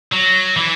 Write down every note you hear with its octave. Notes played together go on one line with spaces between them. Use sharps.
F#3
E3